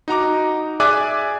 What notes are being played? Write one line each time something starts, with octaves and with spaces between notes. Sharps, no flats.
D#4 F#4 A#5 D6
G#4 D5 E5 G#5 D6 F#6